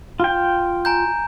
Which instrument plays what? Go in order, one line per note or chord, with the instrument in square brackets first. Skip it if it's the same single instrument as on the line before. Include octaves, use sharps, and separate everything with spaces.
[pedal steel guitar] F4 G5
[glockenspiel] G#5 A#5 G6